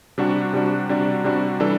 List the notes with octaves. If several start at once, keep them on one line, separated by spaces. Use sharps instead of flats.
C3 G3 D4 F#4
C3 G3 D4 F#4
C3 G3 D4 F#4
C3 G3 D4 F#4
E3 G3 D4 A4